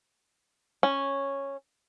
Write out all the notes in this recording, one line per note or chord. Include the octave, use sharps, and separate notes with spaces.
C#4